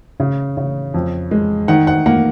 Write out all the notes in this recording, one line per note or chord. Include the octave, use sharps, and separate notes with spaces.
C#3
C#3
F2
G#3
D#3 F#5
F#5
A#3 F#5